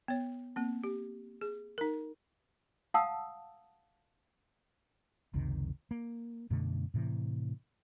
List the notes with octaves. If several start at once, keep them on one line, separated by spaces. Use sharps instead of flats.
B3 C#5
A#3 C4
G4
G#4
D#4 A#4
F5 F#5 A5 D#6 E6
F#1 C#2 C3 D#3
A#3
F#2 B2 D3 A3
A2 C3 E3